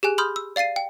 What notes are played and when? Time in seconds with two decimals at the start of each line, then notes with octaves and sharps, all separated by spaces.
0.03 G4 G#4 G#5 F#6
0.18 B5 C6 D#6 F6 G6
0.36 E6
0.56 D5 F5 A6 C7 D#7
0.76 G5